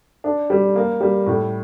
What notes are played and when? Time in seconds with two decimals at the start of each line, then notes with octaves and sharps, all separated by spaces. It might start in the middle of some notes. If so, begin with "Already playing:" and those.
0.24 D4
0.50 G3
0.76 A#3
1.01 G3
1.26 A2